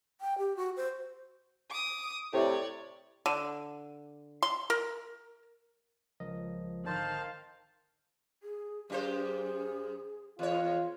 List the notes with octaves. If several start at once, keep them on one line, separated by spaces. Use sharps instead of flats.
G5
G4
F#4
C5
D6 D#6
A2 C3 C#5 D5
D3
C6
A#4
C#2 F3 A#4 D#5
G#1 D3 D#3 C5 F5 A5
G#4
F#2 G4 G#4 C5
E2 F4 C#5